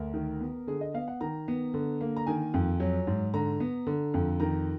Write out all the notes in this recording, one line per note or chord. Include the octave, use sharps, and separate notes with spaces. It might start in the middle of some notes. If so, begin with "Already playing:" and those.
Already playing: D2 A#4
D#3
B3
D3 G#4
D#5
B3 F5
F#5
D#3 A#5
B3
D3
A#3
A#5
D#3 G#5
F2
F#3
G#2
D3 A#5
B3
D3
F2
D#3 A#5